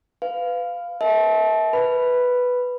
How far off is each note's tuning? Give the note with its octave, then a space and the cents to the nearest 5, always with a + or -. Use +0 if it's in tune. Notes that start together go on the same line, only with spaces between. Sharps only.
B4 +25 F5 +0
A#4 +0 E5 -35 A5 -30
B4 +0 B5 +0